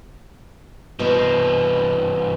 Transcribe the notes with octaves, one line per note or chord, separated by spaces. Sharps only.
G2 B2 E3 A#4 C5